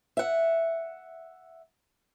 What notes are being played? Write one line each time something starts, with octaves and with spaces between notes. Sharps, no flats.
E5 F#5